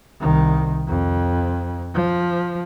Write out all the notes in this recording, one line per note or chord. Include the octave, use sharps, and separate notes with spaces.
C2 D#3
F2
F3